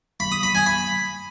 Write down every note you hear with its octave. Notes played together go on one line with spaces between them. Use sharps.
B5
D#6
B5
G#5
B5